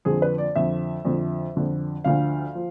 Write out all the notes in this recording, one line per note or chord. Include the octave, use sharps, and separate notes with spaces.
F2 D3 F3 G#4
B4
D5
F2 D3 F3 E5
F2 D3 F3
F2 D3 F3
D2 D3 F3 F5
F3